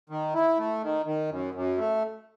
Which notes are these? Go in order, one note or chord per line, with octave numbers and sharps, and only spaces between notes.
D#3
E4
A3
D#3
D#3
F#2
F#2
A3